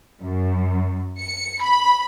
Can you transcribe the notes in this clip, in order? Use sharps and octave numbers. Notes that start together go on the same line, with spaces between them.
F#2
C#7
B5